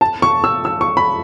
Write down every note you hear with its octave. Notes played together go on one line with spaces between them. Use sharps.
A5
C#6
E6
E6
C#6
B5